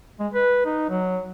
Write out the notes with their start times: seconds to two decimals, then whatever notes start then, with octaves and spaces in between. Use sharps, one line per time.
0.19 G#3
0.34 B4
0.65 D#4
0.90 F#3